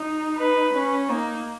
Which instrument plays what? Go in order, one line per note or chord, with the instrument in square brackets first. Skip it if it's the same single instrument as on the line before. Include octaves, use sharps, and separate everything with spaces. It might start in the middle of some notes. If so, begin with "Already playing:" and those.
Already playing: [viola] D#4
[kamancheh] B4
[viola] C#4
[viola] A#3 [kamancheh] D#4